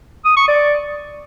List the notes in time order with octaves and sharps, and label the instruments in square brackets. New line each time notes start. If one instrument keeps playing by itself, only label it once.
[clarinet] D#6
C#6
D5